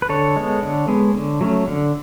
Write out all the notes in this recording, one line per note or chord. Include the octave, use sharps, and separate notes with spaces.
B4
D3 A4 C#5
G#3 B3
D3
G#3 B3
D3
F#3 A3 C#4
D3